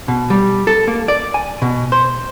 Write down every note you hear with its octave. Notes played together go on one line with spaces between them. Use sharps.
B2
G3
A4
A#3
D5
G#5
B2
C5